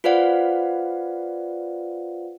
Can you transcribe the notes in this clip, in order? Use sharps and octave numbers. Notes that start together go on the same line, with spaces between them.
F4 B4 C5 D5 F5 F#5